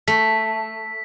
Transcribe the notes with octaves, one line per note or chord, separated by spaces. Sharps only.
A3 B6